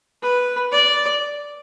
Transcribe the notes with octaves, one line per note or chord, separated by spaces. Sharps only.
B4
D5